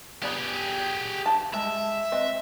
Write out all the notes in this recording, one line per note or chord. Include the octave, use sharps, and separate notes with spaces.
B3 G4 G#4 D5 B5
A5
G#3 E5
C4 B4 D#5